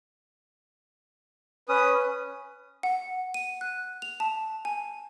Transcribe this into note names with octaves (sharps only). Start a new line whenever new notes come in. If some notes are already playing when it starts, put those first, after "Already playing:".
C#4 B4 D#6
F#5
D#7
F#6
F7
A5
G#5